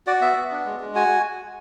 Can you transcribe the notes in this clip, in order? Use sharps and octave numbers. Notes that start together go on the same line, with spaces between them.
F#4 D5
B3 E5
B3
D4
G#3
G#3
F#4 G#5